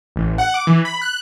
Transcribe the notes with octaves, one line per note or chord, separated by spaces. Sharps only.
A1
F#5
D6
E3
B5
F#6